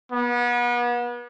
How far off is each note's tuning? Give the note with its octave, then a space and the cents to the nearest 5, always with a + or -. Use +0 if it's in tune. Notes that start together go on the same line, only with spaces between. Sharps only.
B3 -35